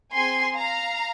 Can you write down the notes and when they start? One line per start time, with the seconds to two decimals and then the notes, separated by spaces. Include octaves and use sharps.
0.14 C4 G#4 G#5 C6
0.57 F5 A#5